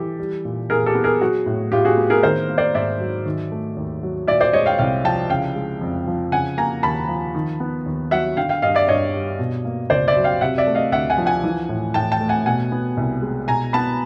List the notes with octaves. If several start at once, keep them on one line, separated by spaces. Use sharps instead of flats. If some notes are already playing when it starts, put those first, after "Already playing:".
Already playing: E3 G4 A4
G3
A#2
A#2 G#4 A#4
G4 A4
B3
G#4 A#4
F#3 F#4 G#4
A2
A2 F4 G4
F#4 G#4
B3
G#4 A#4
D#3 A#4 C5
A#3
C5 D5
G#2 D5 E5
F#3
D#3
A3
D#2
F#3
A#2 D5 E5
C5 D5
G#3 C#5 D#5
F5 G5
C2 F5 G5
F3 G5 A5
C#3 F5 G5
G#3
F2
F3
C#3 F#5 G#5
A#3 G#5 A#5
D#2 A5 B5
F3
D#3
B3
D#2
F#3 E5 F#5
D3 F5 G5
F5 G5
G2 D#5 F5
D5 E5
G2 C#5 D#5
G3
B2
A#3
C#2 C5 D5
D5 E5
F#3
F5 G5
C3 E5 F#5
D5 E5
A3
D#5 F5
D2 E5 F#5
F#5 G#5
F3
F#5 G#5
E3
A2
A2 G5 A5
G5 A5
A3
F#5 G#5
B2 F#5 G#5
B3
C2
G#3
B2 G#5 A#5
B3 A5 B5